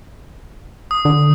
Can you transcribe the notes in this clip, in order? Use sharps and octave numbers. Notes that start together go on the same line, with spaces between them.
D#6
D3